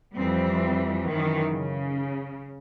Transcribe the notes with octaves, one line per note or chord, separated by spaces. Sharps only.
F2 E3 G3 C4
F#2 D#3 E3
C#3